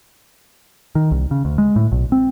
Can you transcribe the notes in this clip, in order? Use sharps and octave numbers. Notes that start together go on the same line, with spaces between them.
D#3
C2
C#3
D2
G#3
A2
B1
C4